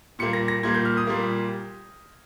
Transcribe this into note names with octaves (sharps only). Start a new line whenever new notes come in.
A#2 G3 A#3 C#7
A#6
A#6
A#2 G3 A#3 G#6
G6
F6
D#6
A#2 G3 A#3